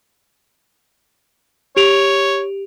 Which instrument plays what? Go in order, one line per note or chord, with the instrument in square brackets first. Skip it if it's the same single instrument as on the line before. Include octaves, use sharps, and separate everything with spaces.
[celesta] G4 D7 F7 [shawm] C#5